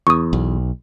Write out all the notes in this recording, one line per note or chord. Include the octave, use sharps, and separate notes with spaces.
E2 C#6 D#6
B1